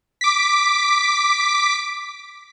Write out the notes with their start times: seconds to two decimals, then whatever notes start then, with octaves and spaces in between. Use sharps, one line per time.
0.21 D6 B6